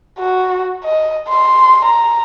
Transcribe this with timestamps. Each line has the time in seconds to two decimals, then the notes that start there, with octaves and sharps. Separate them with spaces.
0.19 F#4
0.84 D#5
1.29 C6
1.85 A#5